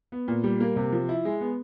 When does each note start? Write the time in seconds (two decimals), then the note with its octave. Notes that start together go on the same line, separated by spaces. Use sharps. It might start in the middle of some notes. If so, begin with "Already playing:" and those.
0.12 B3
0.28 A#2
0.44 G3
0.60 A#3
0.76 C3
0.92 F3
1.09 E4
1.25 G#3
1.41 B3